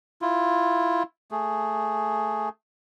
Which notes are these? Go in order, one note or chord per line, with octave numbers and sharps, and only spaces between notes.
E4 F4
A3 G#4